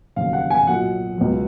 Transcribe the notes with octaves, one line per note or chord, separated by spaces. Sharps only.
F1 D#2 C#3 F#3 F5
F#5
G#5
B1 A#2 F#3 F#5
C#2 B2 F#3